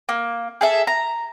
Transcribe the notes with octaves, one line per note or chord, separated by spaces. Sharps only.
A#3
G#4 A4 E5
A#5